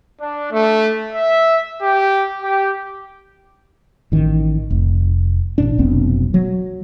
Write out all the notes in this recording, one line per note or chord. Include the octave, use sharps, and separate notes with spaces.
D4
A3
E5
G4
G4
A1 D#3
F1
A1 A#2 D4
F1 B1 B3 C4
F#3